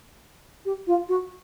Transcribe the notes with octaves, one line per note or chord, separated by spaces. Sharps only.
G4
F4
F#4